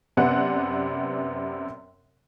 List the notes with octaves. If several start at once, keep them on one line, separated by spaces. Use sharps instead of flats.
F#2 C3 B3 D5 F#5 F#6